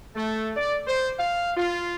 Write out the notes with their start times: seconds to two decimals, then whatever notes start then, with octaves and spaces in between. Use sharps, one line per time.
0.16 A3
0.56 D5
0.86 C5
1.18 F5
1.57 F4